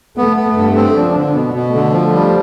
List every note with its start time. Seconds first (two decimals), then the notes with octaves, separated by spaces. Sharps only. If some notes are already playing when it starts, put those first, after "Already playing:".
0.17 A3 B3
0.37 B3
0.57 G2
0.76 C4
0.95 F3 D4
1.16 D3
1.35 B2 B3
1.54 B2
1.74 D3 A3
1.93 F3
2.13 G3